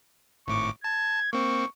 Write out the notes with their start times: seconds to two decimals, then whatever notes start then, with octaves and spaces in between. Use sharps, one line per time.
0.48 G#1 A2 C#6 D6
0.84 A5 G#6
1.33 A#3 C4 C#6